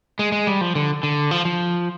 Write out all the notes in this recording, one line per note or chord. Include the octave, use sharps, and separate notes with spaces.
G#3
G#3
G3
F3
D3
D3
F3
F3